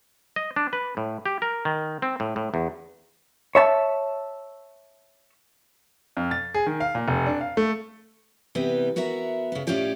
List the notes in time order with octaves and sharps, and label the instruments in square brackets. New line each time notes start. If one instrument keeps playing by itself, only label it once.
[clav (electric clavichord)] D#5
D4
B4
A2
G4
A#4
D#3
C4
A2
A2
E2
[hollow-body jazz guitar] C#5 E5 A5
[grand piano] F2
A6
G#4
D#3
F5
A#2
F1
D4
F5
A3
[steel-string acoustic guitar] C3 E3 G3 B3
B3 F#4 A#4 E5
C#3 B3
A2 C#4 F4 G4 D5